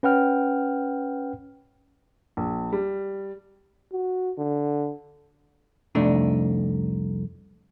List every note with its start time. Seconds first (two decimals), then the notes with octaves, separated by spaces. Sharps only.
0.03 C#4 B4 F#5 G5 F6
2.37 A#1
2.72 G3
3.92 F#4
4.38 D3
5.95 C2 F2 A3 D4 D#4